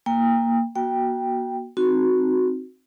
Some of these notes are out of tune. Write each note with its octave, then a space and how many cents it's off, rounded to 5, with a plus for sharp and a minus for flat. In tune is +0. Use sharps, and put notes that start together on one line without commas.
A#3 +0 G5 +30
A#3 +45 F#4 +0 G5 +0
C4 +0 D#4 +0 F#4 -5